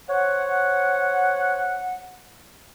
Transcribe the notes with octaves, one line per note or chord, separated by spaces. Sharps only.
C5 C#5 F#5